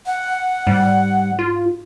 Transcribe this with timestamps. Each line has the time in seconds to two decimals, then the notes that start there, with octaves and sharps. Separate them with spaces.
0.06 F#5
0.67 G#2 G3
1.39 F4